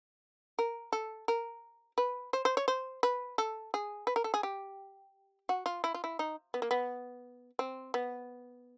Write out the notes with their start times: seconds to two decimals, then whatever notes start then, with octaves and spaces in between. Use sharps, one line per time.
0.59 A#4
0.93 A4
1.28 A#4
1.98 B4
2.33 C5
2.45 C5
2.57 C#5
2.68 C5
3.03 B4
3.38 A4
3.74 G#4
4.07 B4
4.16 A#4
4.24 A4
4.34 G#4
4.43 G4
5.49 F#4
5.66 F4
5.84 E4
5.94 F4
6.04 E4
6.19 D#4
6.54 B3
6.62 A#3
6.71 B3
7.59 C4
7.94 B3